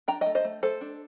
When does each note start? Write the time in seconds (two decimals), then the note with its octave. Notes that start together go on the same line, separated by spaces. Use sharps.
0.08 D4 G5 A#5
0.21 A3 D#5 G5
0.35 C5 D#5
0.45 A3
0.63 A3 A4 C5
0.81 D4